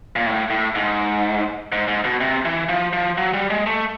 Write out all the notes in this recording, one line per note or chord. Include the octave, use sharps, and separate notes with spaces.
A#2
A2
A2
G#2
G#2
G#2
B2
C3
E3
F3
F3
F#3
G3
G#3
A3